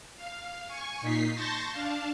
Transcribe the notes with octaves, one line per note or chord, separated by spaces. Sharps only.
F5
G#5 C#6
A#2 D#4 B6 C7
A5 C6 C#6 G6 A6 A#6
D4 F5 A5